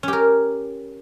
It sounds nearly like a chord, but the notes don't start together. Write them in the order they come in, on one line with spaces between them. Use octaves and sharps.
C#4 G4 A#4